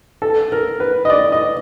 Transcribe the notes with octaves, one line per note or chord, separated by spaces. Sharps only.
A4
A#4
B4
D#5
D5
D#5